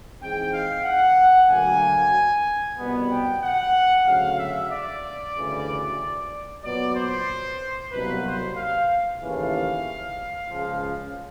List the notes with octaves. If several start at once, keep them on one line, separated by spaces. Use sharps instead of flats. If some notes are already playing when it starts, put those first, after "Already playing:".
G#2 E3 G#3 C4 G5
F5
F#5
D2 D3 F#3 A#3 G#5
C2 B2 G3 B3
G5
F#5
D2 C#3 F#3 F5
E5
D5
D2 C#3 E3 G3
A#2 F#3 B3 D5
C5
C2 B2 F#3 A#3 B4
C5
F5
D#2 C#3 E3 A3 F5
C#2 C#3 F3